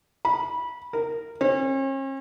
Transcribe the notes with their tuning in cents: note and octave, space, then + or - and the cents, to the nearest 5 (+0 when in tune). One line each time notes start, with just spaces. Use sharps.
B5 -20
A#4 -15
C#4 -45